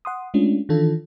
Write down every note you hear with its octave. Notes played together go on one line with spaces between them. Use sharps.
F#5 C6 D#6
G#3 A3 C#4 D4 F4
D#3 E3 D4 F4 A4